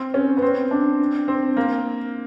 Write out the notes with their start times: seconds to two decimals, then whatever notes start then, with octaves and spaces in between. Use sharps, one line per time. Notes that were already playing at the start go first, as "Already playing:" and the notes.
Already playing: C4
0.14 C#4
0.37 B3
0.42 C4
0.71 D4
1.28 C4
1.57 A#3